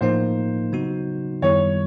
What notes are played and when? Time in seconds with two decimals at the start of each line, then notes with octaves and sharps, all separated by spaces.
0.01 A2 F3 A#3 D#4 C5
0.72 C#3 F#3 B3 D#4 F#4
1.42 F#2 D#3 G3 B3 E4 C#5